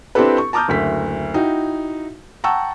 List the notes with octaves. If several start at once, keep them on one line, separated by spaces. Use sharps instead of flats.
C4 D4 E4 G4 A4 B4
C#6
A5 A#5 D6 D#6 F6 G6
F#1 D2 B6
D#4 E4 F#4 G5
F#5 G5 A5 A#5 C#6 E6